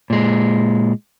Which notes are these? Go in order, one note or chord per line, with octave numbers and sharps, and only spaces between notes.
A#2 G#3